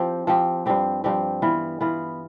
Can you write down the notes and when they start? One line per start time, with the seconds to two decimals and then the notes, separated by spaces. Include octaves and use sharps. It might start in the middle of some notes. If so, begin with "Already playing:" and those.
Already playing: F3 C4 G4
0.27 F3 C4 G4
0.66 G2 F3 C4 G4
1.04 G2 F3 C4 G4
1.42 E3 B3 F4
1.81 E3 B3 F4